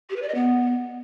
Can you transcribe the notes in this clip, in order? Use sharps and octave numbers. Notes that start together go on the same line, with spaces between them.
G4
B4
D5
D#5
B3